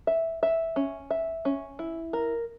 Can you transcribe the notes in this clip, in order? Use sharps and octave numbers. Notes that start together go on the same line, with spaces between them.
E5
E5
C#4
E5
C#4
E4
A#4